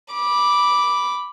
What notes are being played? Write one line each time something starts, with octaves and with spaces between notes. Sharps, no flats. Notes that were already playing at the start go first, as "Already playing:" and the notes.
B5 D6